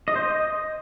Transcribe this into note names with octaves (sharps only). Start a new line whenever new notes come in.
D#5
C5
D#5